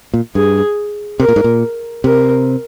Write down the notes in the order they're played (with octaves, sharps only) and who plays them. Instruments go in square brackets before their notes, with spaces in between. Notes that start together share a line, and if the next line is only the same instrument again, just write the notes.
[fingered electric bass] A#2
[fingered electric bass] G2 [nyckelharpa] G#4
[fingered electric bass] C3 [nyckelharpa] A#4
[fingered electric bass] A#2
G#2
A#2
[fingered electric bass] C3 [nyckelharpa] A#4